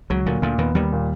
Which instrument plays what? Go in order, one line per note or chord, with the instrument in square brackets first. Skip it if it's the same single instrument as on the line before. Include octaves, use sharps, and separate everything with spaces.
[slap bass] C#2 C#3 [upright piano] F#3
[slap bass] D2 D3 [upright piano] A#2
[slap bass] D2 D3 [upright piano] A#2
[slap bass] D#2 D#3 [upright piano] B3
[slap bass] D#2 D#3 [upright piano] G3
[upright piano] A#2